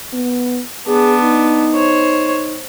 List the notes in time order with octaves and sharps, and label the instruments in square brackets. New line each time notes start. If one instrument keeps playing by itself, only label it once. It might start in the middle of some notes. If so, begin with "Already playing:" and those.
[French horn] B3
[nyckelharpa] B3 D4 [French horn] G#4
[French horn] D#4
[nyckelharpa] C5 C#5